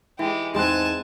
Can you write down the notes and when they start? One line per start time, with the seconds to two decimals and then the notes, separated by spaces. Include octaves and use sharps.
0.19 E3 G#3 G4
0.54 E2 G#2 G#3 C4 G#5 A5 F#6